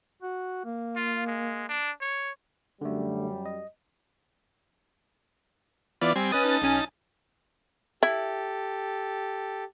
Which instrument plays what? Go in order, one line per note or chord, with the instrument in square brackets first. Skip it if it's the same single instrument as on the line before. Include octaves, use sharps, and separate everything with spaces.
[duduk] F#4
A#3
[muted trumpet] F4
G#3
D4
C#5
[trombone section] F#2 G3 [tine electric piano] D3 A3
[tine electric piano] D#5
[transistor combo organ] E3 B3 F4 [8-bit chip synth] D5 D6
[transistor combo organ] G3 G#5 C6 [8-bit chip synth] C4
[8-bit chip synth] C#4 B4 A6 [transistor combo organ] D#5 D#6
[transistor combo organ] D#4 A5
[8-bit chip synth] B1 C#4 G#5
[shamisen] E4 [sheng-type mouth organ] G4 A4